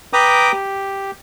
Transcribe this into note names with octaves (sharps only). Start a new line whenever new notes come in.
B4 G5 A#5 D6 D#6
G4